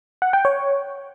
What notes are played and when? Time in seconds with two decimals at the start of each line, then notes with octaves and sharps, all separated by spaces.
0.22 F#5
0.33 G5
0.45 C#5